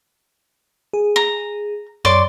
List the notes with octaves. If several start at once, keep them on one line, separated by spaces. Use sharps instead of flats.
G#4
A#5
F#2 C#5 D5 C6 D6